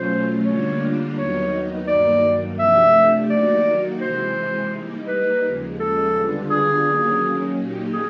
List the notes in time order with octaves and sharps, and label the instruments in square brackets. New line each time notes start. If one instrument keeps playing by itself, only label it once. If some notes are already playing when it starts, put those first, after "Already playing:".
Already playing: [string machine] B2 F#3 A3 C#4 F4 [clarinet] C5
[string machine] D3 G3 A#3 D4 F4 [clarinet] C#5
[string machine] D#2 D#3 F#3 B3 D#4 [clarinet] C#5
[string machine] G2 D#3 F#3 A#3 [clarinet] D5
[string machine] C3 F3 A3 D4 G4 [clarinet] E5
[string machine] D#3 F#3 A#3 D#4 F#4 [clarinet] D5
[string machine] C3 E3 G#3 [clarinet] C5
[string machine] G3 A#3 D#4
[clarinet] B4
[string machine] D#2 C#3 F3 G#3
[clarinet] A4
[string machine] D3 G3 B3 D4 F4
[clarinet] G#4
[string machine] D#3 F#3 A#3 C#4
A#2 F#3 A#3 D#4 G4
[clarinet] G#4